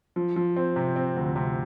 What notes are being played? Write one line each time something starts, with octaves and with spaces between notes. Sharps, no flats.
F3
F3
C4
C3
C4
D2
C3